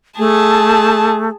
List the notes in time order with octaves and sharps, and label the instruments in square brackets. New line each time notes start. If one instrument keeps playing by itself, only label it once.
[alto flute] A3 [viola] G#4 A5